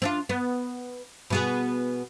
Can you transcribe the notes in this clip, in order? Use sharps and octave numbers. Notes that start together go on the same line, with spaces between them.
C4 D4 F4
B3
B2 B3 G#4